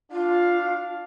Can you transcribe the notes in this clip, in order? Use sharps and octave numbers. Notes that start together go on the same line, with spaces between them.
D4 F4 F5